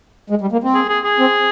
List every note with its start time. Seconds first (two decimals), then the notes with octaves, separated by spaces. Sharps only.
0.30 G#3
0.41 G3
0.52 A#3
0.64 C4
0.75 G#4
0.89 G#4
1.04 G#4
1.19 C4